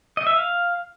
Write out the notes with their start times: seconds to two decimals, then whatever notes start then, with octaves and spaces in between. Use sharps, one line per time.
0.17 D#5
0.27 E5
0.36 F5